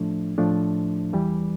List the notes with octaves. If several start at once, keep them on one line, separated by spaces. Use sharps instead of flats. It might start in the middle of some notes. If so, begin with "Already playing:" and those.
Already playing: A2 F3 A3 D4
A2 F3 A3 D4
E2 E3 G3